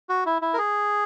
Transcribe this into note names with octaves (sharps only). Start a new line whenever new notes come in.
F#4
E4
E4
A#4
G#4